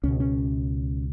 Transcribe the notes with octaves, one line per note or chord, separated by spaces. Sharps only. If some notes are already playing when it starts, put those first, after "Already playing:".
C#2 B2 C#4
C#4